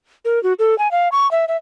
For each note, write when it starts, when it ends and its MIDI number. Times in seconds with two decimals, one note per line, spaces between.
0.25 0.42 70
0.43 0.53 66
0.59 0.77 69
0.78 0.90 80
0.91 1.09 77
1.12 1.30 85
1.31 1.45 76
1.48 1.57 76